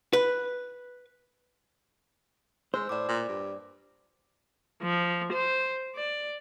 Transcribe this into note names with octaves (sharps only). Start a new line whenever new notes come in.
B4
G#3 C5 E6
A2 D5 D6
A#2
G2
F3
C5
D5